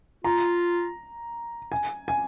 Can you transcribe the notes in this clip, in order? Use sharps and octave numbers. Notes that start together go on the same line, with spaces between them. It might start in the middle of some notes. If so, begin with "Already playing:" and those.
F4 A#5
G#5
G#5